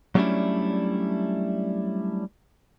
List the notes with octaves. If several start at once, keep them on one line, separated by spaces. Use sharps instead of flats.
F#3 G3 A3 C#4 D4 E4